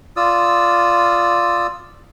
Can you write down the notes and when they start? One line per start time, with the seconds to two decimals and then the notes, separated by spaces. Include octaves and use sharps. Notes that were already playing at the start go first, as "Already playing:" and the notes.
0.17 F4 D5 D#6 E6